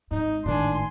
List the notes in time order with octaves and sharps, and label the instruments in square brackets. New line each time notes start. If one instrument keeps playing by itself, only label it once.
[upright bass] G#1 G#2 [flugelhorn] D#4
[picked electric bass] G#1 D#3 [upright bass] A2 [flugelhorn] D4 [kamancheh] G#5 C6